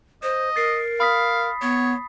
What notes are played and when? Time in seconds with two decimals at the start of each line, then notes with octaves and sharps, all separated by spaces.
0.23 C5 D#5
0.56 A#4 A6 C7
1.00 F5 B5 D#6 B6
1.62 B3 C#5